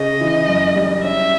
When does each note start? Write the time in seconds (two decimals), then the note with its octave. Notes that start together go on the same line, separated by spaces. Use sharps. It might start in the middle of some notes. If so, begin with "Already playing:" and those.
Already playing: C#3 D#5
0.21 E3
0.48 F#2
0.76 G3
1.04 C#4 E5